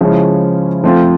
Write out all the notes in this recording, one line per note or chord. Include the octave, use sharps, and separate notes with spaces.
C#3 F3 G#3 C#4 E4
F3 A3 C4 F4